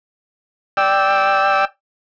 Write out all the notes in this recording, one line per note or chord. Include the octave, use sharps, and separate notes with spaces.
D5 G5 E6